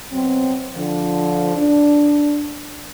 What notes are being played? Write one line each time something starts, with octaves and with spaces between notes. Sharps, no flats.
B2 F#3 C4
D3 F3
D4